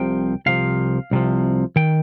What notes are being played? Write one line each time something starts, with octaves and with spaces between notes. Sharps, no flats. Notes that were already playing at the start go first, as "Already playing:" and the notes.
Already playing: C2 C3 F3 G5
C2 C3 F3 F5
C2 C3 F3
D#3 G5